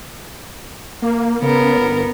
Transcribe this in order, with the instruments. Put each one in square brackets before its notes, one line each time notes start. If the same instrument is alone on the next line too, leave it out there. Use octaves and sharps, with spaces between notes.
[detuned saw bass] A#3
[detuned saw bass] C#3 [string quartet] B3 A#4
[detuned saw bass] G1